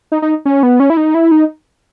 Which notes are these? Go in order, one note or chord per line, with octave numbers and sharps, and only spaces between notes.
D#4
D#4
C#4
B3
C#4
E4
D#4
E4
D#4